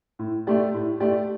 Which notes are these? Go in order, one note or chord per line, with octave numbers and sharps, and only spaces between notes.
A2
A3 G4 D5
A2
A3 G4 D5